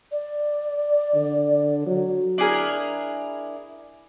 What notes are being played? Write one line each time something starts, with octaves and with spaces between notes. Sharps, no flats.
D5
D3
F#3
D4 E4 G#4 A#4